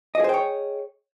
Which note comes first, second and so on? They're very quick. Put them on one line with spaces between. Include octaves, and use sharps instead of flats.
D#5 G#4 C5 G5 C#5